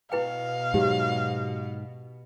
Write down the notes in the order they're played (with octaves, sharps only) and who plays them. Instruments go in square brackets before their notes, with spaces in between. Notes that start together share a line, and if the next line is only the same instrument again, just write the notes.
[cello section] B2 [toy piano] E4 B4 G5 [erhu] F5
[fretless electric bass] G#2 F#3 [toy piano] G4